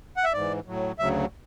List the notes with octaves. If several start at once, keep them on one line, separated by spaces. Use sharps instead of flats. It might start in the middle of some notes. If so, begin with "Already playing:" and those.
F#5
E5
G#2 E3 D5
A2 F#3
D2 C#3 F#3 E5